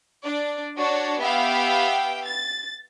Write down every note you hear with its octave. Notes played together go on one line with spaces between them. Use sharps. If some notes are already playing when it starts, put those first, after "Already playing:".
D4 D5
D4 F#4 C#5 A5
B3 G4 E5 F5 G5
A6